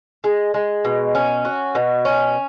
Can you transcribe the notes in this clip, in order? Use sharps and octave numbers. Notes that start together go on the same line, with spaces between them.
G#3
G#3
B2
C#4
F#4
B2
C#4